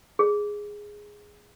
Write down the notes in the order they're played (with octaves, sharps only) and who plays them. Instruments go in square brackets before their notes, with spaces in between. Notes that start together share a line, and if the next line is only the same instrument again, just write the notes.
[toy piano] G#4